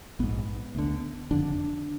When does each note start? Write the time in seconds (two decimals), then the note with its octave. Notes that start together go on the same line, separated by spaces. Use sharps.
0.19 A#1 G#2 B3
0.75 D2 D3
1.31 F#1 F2 D3 D4